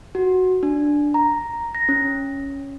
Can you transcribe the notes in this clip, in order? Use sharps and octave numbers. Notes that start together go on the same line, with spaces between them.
F#4
D4
A#5
A#6
C#4